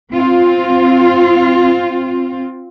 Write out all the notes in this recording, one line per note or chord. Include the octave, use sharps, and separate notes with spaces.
C4 F4